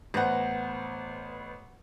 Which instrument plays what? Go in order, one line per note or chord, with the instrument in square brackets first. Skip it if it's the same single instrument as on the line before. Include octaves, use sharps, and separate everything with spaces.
[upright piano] A1 B3 C5 [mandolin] F#5 A#5